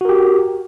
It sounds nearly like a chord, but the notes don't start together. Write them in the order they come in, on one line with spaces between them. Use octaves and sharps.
F#4 A#4 G4